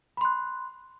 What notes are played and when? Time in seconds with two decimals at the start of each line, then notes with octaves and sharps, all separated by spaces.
0.17 B5
0.21 C6
0.25 F#6